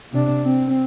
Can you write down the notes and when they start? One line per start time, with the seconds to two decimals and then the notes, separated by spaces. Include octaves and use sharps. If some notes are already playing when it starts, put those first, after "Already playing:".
0.12 C3 D4
0.44 C4